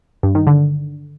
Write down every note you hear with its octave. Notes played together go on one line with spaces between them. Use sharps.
G2
D#3
D3